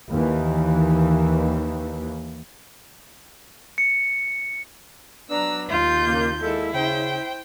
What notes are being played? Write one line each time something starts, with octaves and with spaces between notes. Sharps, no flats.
D#2 E3
C#7
F#3 B3 D4 A#5 E6
D#2 F4 G6
C#3 A#3
G#3 A#3 E4 A4
C#3 C5 G5